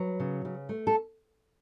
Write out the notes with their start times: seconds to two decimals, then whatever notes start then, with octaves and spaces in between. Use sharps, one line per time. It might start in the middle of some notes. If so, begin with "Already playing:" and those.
Already playing: F#3 B4
0.20 C#3
0.45 C#3
0.69 A3
0.87 A4